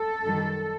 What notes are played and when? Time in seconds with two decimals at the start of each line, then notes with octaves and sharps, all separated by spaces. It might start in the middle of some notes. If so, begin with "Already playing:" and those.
Already playing: A4
0.23 F#2 D#3 G3